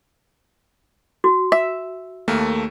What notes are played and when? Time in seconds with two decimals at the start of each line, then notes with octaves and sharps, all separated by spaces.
1.24 F#4
1.52 E5
2.28 D#2 A3 A#3